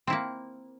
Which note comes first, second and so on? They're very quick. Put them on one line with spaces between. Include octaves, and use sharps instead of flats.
C4 E4 A#3